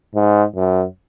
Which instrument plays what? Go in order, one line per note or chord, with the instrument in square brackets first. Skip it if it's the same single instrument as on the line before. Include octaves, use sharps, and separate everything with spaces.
[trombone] G#2
F#2